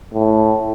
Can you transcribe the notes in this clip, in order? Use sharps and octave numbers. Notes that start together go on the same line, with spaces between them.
A2